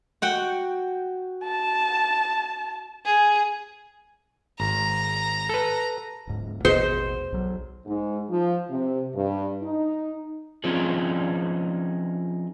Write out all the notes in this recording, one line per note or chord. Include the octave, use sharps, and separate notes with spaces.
F#4 F#5 G5
A5
G#4
G#1 A#5
A4 B4
D1 G#2
A1 E2 B2 G#4 B4 C5 D#5
B1 F#3
G#2
F3
C3
G2
D#4
F3 C4 C#4 D#4 F4 G#4